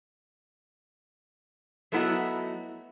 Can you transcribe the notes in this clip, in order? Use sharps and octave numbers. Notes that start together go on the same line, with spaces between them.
F#3 A3 B3 E4 F#4 D#5